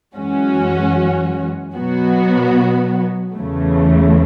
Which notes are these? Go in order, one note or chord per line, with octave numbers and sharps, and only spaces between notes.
F#2 E3 G#3 C#4 F#4
B2 F#3 B3 F#4
E2 C#3 E3 A3